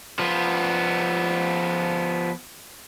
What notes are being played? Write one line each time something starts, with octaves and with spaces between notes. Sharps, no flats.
F3 B3